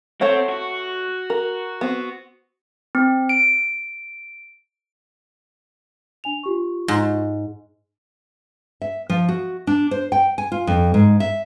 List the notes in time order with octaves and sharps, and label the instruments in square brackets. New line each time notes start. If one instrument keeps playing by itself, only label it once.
[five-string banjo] A3 C#5 F#5 [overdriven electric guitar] C4
[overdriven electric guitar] F#4
[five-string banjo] A#4
B3 C4
[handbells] C4
D7
[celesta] D4 G#5 F7
F4 G4 C#6
[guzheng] G#2
[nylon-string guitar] E5
F3
F#4
D4
C5
G5
G#5
F4
F2
G#2
E5